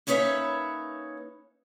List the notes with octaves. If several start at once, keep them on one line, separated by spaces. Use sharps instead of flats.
A#3 C#4 D#4 B4 C#5 E5